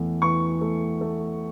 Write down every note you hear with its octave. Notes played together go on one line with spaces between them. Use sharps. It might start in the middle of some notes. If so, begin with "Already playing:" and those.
Already playing: E2 E3 A3
E3 C#6
A3
A3